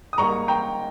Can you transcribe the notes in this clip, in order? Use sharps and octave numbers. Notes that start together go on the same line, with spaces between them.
D#6
G#2 G3 A#3 A#5 C#6
G5 A#5